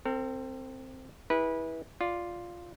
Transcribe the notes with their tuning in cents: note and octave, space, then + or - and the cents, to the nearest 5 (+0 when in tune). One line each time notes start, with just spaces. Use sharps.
C4 +0 A4 +45
E4 -25 G#4 -30 B4 -25
F4 +0 D5 +0